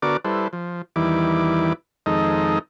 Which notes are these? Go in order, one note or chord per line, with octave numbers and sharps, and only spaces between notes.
D3 B3 F#4 A#4 D5 D6
G3 E4 A4 B4 C5
F3
E2 D#3 E3 G3 E4 D6
F2 D#3 G#3 D#4 A4 D#5